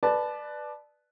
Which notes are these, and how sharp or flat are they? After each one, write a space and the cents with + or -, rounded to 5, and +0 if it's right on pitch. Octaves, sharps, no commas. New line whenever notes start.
B4 +0 D5 +15 A5 -20